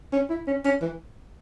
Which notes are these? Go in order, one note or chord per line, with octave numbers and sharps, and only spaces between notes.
C#4
E4
C#4
C#4
E3